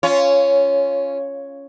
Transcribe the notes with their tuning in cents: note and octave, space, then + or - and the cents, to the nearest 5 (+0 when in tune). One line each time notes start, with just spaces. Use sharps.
C#4 +0 F4 -15 C#5 +15